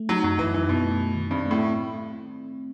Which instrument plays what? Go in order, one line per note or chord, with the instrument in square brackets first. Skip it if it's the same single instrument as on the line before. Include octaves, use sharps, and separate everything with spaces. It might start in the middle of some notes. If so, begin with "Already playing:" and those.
Already playing: [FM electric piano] A3
[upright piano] F#3 [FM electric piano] D#4
[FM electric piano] F#2 [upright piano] F#3
[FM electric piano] F#2 [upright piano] E3
[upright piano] E3 [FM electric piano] D#4
[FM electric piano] F#2 [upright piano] B2
[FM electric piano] A3
A3
D#3
[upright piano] G2 [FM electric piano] C4
[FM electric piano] A3
[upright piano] A2